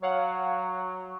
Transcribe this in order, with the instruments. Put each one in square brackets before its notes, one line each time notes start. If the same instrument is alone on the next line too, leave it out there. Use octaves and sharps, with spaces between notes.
[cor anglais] F#3 [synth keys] C#5 F5 F#5